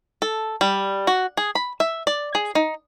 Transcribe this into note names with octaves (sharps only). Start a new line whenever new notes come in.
A4
G3
F#4
G#4
B5
E5
D5
G#4
D#4